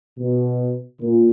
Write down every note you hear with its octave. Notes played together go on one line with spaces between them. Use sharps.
B2
A#2